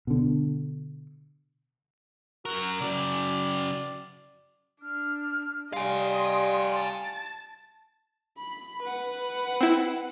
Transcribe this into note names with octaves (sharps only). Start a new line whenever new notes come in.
B2 D3
F#2 F#4 A#4
C#3 F#3 D5
D4 F6
G3 D#5 F5 G#5 C6 D#6
A5 A6
B5
B4 F#5
C4 E4